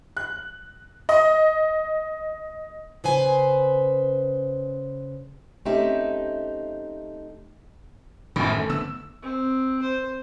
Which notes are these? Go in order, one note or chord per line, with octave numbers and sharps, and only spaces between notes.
F#6
D#5
C#3 B4 C5 G#5
A3 C4 C#4 D#4 G4 E5
A1 F#2 D#3
A3
D3 B3 E6
C4
C5